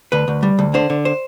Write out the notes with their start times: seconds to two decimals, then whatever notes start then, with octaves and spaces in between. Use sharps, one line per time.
0.12 D2 B4
0.28 D2
0.43 G3
0.59 D2
0.74 D3 C5
0.90 D3
1.05 C5